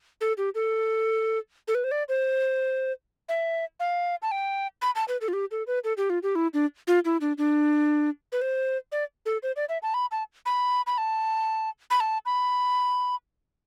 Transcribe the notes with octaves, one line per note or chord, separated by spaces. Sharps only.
A4
G4
A4
A4
B4
C5
D5
C5
E5
F5
A5
G5
B5
A5
B4
A4
F4
G4
A4
B4
A4
G4
F4
G4
E4
D4
F4
E4
D4
D4
B4
C5
D5
A4
C5
D5
E5
A5
B5
A5
B5
B5
A5
B5
A5
B5